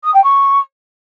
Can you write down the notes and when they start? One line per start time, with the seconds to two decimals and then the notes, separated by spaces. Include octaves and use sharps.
0.04 D#6
0.14 G5
0.24 C#6